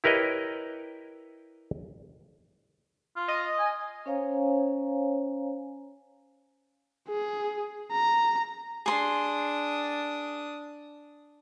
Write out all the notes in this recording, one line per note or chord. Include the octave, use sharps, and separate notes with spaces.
E4 G4 A#4 B4 C#5 D#5
F4
D#5
G#5
C#4 C5 C#5 F5 G#5 A#5
G#4
A#5
D4 G#4 C6 D#6